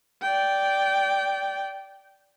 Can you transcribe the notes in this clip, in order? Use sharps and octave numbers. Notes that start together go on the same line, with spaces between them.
D5 G5